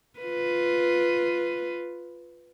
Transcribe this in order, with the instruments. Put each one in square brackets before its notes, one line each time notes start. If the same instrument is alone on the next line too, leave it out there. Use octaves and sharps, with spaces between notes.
[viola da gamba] F4 B4